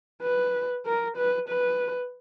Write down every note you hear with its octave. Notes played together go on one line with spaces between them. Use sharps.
B4
A#4
B4
B4